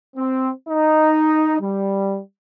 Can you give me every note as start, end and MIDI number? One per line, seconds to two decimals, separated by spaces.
0.17 0.50 60
0.69 1.58 63
1.60 2.19 55